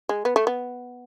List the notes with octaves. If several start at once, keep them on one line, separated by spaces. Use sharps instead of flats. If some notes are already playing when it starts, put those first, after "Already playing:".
G#3
B3
A3
B3